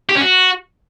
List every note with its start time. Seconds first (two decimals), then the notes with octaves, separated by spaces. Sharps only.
0.09 G4
0.15 C#4
0.21 F#4